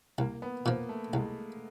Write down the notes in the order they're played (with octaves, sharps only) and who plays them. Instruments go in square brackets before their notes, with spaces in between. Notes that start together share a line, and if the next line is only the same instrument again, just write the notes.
[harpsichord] C2 [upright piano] A#3
[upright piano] B3
[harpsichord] A#2 F3 [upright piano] A#3
[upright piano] A3
[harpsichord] C2 [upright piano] G#3